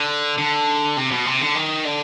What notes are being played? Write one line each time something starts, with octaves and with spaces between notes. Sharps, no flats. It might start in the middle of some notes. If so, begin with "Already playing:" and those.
Already playing: D3
D3
C3
B2
C3
D3
D#3
D3